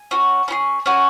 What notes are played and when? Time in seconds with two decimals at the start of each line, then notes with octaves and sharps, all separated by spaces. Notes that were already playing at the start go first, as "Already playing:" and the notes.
Already playing: G#5
0.11 C#4 F#4
0.48 C#4 E4 G#4
0.86 C#4 F#4 G#5